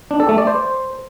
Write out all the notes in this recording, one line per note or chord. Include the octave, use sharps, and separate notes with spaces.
D4
A4
A3
D5
C5